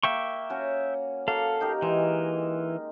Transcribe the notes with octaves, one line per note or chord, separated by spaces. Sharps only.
A#3 E5 G5 C#6
C#4 F#4
A#3 F#4 A4 F5 A#5
D#4 G4 A#4
E3 G#3